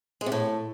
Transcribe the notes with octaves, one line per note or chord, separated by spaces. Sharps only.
G#3
C3
A2